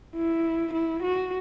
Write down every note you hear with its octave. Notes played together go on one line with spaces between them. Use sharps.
E4
E4
F#4